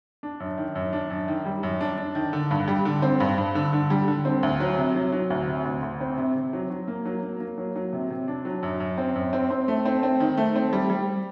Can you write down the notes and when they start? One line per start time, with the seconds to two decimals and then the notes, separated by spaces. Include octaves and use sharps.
0.23 D4
0.40 F#2
0.58 D#3
0.75 F#2
0.93 D4
1.10 F#2
1.28 D#3
1.46 G3
1.63 F#2
1.81 D4
1.98 D4
2.15 D#3
2.33 D3
2.51 G2
2.68 G3
2.85 D3
3.02 C4
3.20 G2
3.38 G2
3.55 D3
3.73 D3
3.90 G3
4.08 D3
4.25 C4
4.43 D2
4.60 F#3
4.78 C3
4.95 F#3
5.12 F#3
5.30 D2
5.48 C3
5.65 D2
5.83 D2
6.00 C4
6.18 C3
6.35 C3
6.53 F#3
6.70 F#3
6.88 A#3
7.05 F#3
7.23 A#3
7.40 A#3
7.58 F#3
7.76 F#3
7.93 C3
8.10 C3
8.28 D4
8.45 F#3
8.63 F#2
8.80 F#2
8.98 C4
9.15 F#2
9.33 C4
9.50 C4
9.68 A3
9.85 C4
10.03 C4
10.20 D#3
10.37 A3
10.56 C4
10.73 G3
10.90 G3